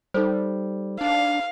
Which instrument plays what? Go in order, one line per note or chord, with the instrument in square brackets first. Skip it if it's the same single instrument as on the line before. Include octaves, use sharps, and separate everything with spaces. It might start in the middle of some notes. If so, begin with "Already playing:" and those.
[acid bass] G3 [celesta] D#4 A4 C5
[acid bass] D4 [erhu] F5